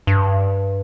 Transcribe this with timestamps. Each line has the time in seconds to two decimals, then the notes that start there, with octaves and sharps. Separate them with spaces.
0.07 G2